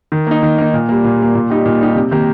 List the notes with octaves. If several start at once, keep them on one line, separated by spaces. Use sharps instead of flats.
D#3
A#3 D#4
D#3
A#3 D#4
A#2
G3 A#3
A#2
G3 A#3
A#2
G3 D#4 G4
A#2
G3 D#4 G4
C3
D#3 A#3 G4